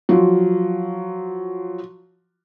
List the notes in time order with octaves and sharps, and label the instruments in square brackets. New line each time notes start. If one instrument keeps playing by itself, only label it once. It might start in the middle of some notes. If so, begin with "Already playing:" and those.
[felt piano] F3 F#3